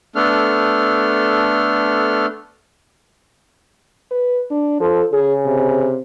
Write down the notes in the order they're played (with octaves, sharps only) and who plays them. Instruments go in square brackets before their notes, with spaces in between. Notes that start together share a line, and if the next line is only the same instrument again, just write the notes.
[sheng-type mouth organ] A3 B3 D4 A4 F6
[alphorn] B4
D4
[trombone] F3 [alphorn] A4
[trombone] C#3 [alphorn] G#4
[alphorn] C3